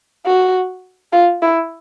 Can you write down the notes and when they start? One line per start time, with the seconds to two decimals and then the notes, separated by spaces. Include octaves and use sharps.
0.26 F#4
1.12 F4
1.42 E4